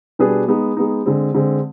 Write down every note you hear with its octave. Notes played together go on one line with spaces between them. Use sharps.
B2 G3 D4 G#4 B4
G#3 B3 D#4
G#3 B3 D#4
D3 G#3 C4
D3 G#3 C4